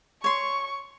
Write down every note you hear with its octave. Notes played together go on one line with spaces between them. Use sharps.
C#5 C6 C#6